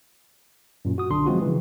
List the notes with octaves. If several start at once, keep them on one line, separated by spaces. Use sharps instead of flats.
F#2 A#2
F#4 D#6
B1 D3 D4 C6
F3 F#3 G#3 C4 F4 F#4
C#3 E3